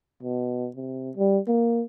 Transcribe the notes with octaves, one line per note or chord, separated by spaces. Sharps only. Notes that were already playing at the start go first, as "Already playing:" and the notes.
B2
C3
G3
A#3